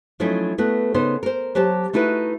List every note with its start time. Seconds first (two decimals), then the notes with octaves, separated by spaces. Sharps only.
0.20 F3 F#3 A3 C#4 D#4 E4
0.58 A3 B3 F#4
0.94 C#3 B3 D#4 C5
1.23 A#4 C5
1.55 F#3 G4 C5 A5
1.93 A3 D#4 E4 F#4 B4